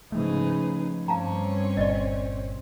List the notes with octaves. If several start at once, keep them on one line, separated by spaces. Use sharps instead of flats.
G#2 C#3 F3 A3 D#4 G#4 B4
G2 C4 C#4 C#5 F5 A5 A#5
G1 A#2 D5 D#5